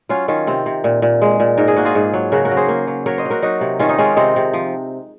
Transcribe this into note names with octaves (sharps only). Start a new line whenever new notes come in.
F#3 C#4 F4
D#3 C#4 F4
C3 C4
C3
A#2
A#2
G#3
A#2
G#2 A#4
G#4
A#3 F#4
F4 G#4
G#2
F#3
C#3 F#4 A#4
F#4 A#4
F#3
G#4 C5
A#3
F#3
F#3 A#4 C#5
C5 D#5
F#3
F#4 A#4
F#3 D#4 F#4
C3
D#3 C#4 F4
D#4
G#3 C#4 F4
C3 C4 D#4
C3
F3